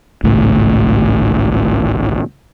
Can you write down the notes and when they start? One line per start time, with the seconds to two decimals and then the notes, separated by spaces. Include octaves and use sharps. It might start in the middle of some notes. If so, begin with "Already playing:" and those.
0.23 G#1 C#2 A2